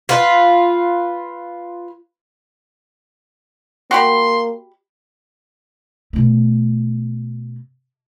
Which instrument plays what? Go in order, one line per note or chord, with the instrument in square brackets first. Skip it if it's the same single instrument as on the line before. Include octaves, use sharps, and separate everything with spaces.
[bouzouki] F4 B4
[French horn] A#3 [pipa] F#4 G4 B5 [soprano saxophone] C6
[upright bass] B2 A3